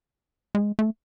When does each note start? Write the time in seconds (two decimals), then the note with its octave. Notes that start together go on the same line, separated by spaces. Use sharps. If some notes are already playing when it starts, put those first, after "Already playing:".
0.55 G#3
0.79 A3